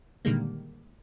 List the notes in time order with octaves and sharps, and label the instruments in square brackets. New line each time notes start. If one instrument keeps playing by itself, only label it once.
[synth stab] A#2 D3 D#3 G3 G#3 A#3